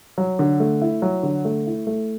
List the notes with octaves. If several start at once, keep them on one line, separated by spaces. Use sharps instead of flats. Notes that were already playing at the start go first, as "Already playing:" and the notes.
F#3
D3
A3
E4
F#3
D3
A3
E4
A3